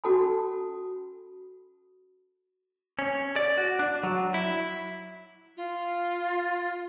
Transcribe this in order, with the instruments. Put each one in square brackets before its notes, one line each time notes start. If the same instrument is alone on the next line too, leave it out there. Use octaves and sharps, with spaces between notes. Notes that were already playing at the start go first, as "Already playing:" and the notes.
[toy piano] C#4 F#4 A4 A5 B5
[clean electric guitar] C#4
D5
F#4
D4
F#3
E4
[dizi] F4